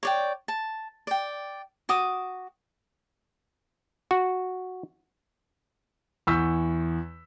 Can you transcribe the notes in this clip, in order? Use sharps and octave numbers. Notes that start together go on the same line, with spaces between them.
C#5 D5 G5
A5
D5 G5
F#4 D6 D#6
F#4
E2 C#6 E6 G6 B6